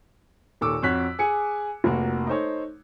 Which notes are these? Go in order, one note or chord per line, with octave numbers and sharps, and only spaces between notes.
D#2 A#2 A4 C#6 D6 E6
F2 F#4 C#5 F#6 B6
G#4 G#5 C#7
F1 A#3 F#4
D#4 A4 C5 C#5